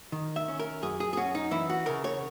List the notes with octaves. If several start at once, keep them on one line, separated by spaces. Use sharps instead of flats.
D#3
E5
C#4
A#4
F#2 G#4
G#4
G#4
C#4 F#4
D#4
E3 E4
F#4
C#3 A#4
C#5